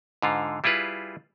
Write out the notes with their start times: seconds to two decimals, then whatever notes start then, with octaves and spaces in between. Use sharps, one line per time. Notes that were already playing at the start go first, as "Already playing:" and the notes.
0.22 G#2 D3 F4
0.64 G3 E4 F4 G#4 B4